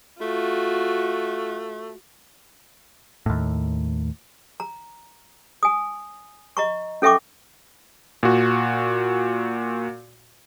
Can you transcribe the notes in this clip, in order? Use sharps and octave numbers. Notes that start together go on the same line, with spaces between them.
A3 F4 F#4
D#2 A2
A#5
G#5 D#6
D#5 A#5 C#6
C#4 A4 E5 G5 C#6 D6
A#2 F#4